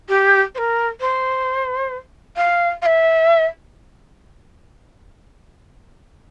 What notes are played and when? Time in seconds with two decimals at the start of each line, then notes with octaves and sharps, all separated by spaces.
0.09 G4
0.55 C5
0.58 A#4
1.01 C5
2.37 F5
2.82 F5
2.86 E5